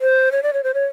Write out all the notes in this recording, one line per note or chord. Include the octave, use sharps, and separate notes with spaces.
C5
C#5
D5
C#5
C5
C#5